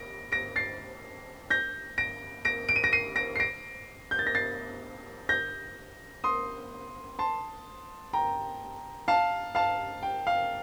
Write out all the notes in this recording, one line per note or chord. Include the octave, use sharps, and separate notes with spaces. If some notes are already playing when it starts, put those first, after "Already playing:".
Already playing: A#6 D7
A#6 D7
A6 C7
G6 A#6
A#6 D7
A#6 D7
D7
D#7
A#6 D7
C7 D#7
A#6 D7
C7
A#6 D7
G6
A6
A#6
A6 C7
G6 A#6
C6 D#6
A5 C6
G5 A#5
F5 A5
F5 A5
G5
F5